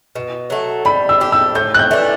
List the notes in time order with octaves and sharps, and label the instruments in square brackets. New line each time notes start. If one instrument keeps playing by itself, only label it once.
[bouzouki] B2
F#3 A3
[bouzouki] G3 [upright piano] B5
[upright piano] E6
[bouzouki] D4 G4
[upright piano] E6
[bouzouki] A2 [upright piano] G6
[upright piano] F#6
G6
[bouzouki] E3 A3 D4